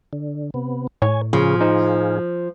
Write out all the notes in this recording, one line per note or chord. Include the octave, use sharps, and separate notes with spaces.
D3
C3 B3
A2 C#5 G#5
C#3 F3 F4 G#4
D#4 C5